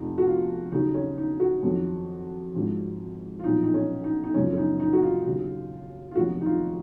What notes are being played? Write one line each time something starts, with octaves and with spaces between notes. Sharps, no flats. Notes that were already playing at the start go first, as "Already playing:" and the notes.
Already playing: F1 F2 F3 D#4
F#4
F4
D#2 C#3 F#3 D#4
C#4
D#4
F#4
F2 D#3 F#3
G#1 G#2 F3
F4
B1 A#2 F3 D#4
D#4
C#4
D#4
D#4
F#1 F#2 C#3 F3 C#4
C#4
D#4
D#4
F#4
F4
D#2 C#3 F#3
F4
F1 D#2 D#3 F#3 F#4
D#4
F4